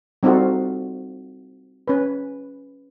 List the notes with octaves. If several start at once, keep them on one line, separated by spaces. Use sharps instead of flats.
G3 C4 D#4 F4 F#4 A4
C#4 B4